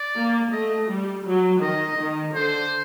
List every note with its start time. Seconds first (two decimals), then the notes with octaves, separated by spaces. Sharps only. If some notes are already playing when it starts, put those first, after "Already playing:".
Already playing: D5
0.16 A#3
0.52 A3 D#5
0.89 G3
1.26 F#3
1.61 D#3 D#5
1.98 D#3
2.34 D3 C5